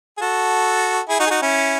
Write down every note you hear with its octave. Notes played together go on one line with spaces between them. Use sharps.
G#4
F#4 A4
E4 G#4
D#4 F#4
G#4
D#4 F#4
C#4 E4